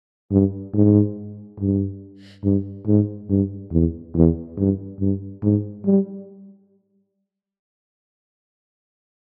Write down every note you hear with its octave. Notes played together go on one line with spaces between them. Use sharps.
G2
G#2
G2
G2
G#2
G2
E2
E2
G2
G2
G#2
G3